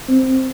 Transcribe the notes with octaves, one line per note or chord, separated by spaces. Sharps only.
C4